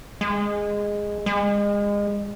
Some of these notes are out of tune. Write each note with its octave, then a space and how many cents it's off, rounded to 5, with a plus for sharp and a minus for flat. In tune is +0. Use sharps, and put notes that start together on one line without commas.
G#3 -10
G#3 -30